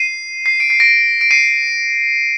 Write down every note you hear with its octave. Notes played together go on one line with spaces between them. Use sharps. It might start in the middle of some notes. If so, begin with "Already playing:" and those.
Already playing: C7 D#7
C7
D7
C7
A#6 D7
D7
C7 D#7